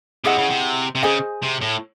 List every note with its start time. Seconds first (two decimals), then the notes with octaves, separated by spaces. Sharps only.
0.25 C3 E4 G#4 D#5 F#5
0.38 C#3
0.50 C3
0.95 C3
1.03 C#3 G#4 C5 D#5 G#5
1.43 C3
1.61 A2